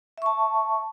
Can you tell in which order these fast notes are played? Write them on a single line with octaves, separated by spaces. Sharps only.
E5 C#6 A5